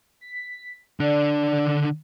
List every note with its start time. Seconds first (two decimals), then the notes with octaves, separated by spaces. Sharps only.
0.21 B6
1.00 D3 D4 D5